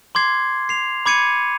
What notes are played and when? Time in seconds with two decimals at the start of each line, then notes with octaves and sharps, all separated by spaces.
0.15 C6 D6 G#6 C7
0.69 C7 F7
1.06 B5 D6 G#6 C#7 D#7